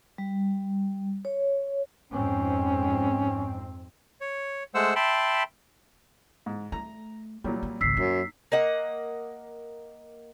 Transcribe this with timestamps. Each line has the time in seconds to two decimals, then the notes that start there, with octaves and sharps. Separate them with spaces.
0.18 G3
1.25 C#5
2.12 F2 G#2 C4 C#4
4.21 C#5
4.74 G#3 A3 C5 F#5 E6
4.96 E5 G5 A5 B5 C6
6.46 G#2
6.72 A3 A#5
7.44 A#2 F#3 G3 E4
7.63 C4
7.81 G#1 C#2 E6 B6 C7
7.97 F#2 D#4
8.52 A#3 D#5 F#5